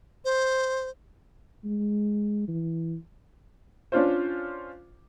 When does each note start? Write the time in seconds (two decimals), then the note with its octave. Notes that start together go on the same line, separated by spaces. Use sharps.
0.25 C5
1.64 G#3
2.48 E3
3.92 C#4 D4 F4 C5